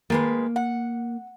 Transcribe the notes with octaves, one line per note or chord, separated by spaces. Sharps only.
D#3 G#3 A#3 B4
F#5